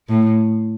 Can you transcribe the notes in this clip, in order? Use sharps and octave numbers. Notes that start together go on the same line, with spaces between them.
A2